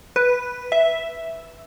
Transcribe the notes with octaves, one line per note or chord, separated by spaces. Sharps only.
B4
E5